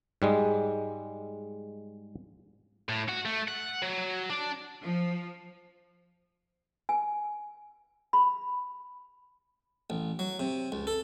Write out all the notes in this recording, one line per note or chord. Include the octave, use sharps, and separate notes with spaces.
G#2 G3 G#3
A2
F#4
A3
F#5
F#3
D4
F3
G#5
B5
A1
F#3
C3
C#2
A4